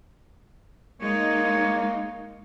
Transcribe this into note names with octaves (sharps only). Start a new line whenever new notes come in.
G#3 A#3 D#4 C#5